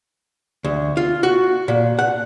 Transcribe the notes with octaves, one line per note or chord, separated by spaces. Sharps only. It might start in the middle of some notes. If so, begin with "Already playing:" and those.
D2
F4
F#4
A#2
F#5